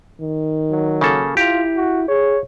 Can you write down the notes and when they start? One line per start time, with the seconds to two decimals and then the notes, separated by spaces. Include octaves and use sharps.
0.21 D#3
0.71 F#3
1.01 C#3 A#3 A4
1.37 E4 F4 G4 A#5
1.76 F#4
2.09 G#4 C#5